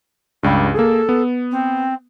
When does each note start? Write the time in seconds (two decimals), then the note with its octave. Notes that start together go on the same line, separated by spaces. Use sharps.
0.43 C#2 G2 G3
0.74 A#3 G#4 A4
1.09 B3
1.51 C4